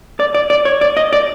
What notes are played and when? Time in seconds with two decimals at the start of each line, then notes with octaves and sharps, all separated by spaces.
0.20 D5
0.35 D5
0.50 D5
0.65 C#5
0.81 D5
0.97 D#5
1.13 D5